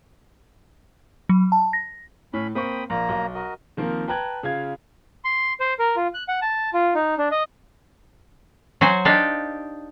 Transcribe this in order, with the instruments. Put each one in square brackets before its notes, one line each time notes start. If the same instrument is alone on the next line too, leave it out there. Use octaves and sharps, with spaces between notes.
[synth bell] F#3
A5
A#6
[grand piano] A2 [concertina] C#4 B5
[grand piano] A#3 C4 C#6 [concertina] G5 B5 D#6
[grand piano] A#1 [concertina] A#3 A#5
[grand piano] B1
[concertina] F#4 A#4 D#5
[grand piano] D#3 F3 A#3 C4 A#4
B4 G5 A5 A#5 F#6 G#6
C#3 F4 F5 G#6
[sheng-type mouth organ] C6
C5
A#4
F4
F#6
F#5
A5
F4
D#4
D4
D#5
[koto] F#3 F#4 C5 G#5
D4 D#4 G4 F5